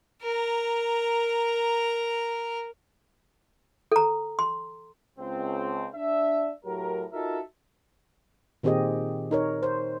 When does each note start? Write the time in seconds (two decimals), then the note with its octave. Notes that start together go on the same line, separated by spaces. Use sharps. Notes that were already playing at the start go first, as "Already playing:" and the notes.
0.22 A#4 A#5
3.92 A4 A#5
4.39 C6
5.19 C#2 C4
5.95 D4 E5
6.65 A2 F#3 G4 A#4
7.12 D#4 F4 F#4 A4 A#4 E5
8.63 A#2 D#3 C4 G4 G#4 D#5
9.31 D#4 A#4 C#5
9.63 C5